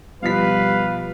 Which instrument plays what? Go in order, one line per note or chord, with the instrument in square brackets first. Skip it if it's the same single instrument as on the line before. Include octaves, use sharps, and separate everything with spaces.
[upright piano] B2 F3 B6 [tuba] G3 [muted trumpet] B4 [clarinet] F5